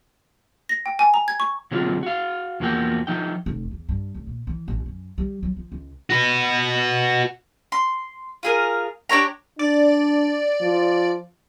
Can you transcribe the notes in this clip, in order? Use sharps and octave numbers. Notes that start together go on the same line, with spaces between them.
A#6
G5
G#5
A#5
G#6
C#6
D3 F#3 G#3 C4 F4
F#4 F5
E2 F3 A#3 F#4 G5
F3 D#4 G5
F1
E2
G2
F1
A#2
E3
A1
F#2
G3
F#3
F3
C#2
F#4 B4
C6
F4 G#4 A#4
D4 G4 C#5 A#5
D4 D5
F3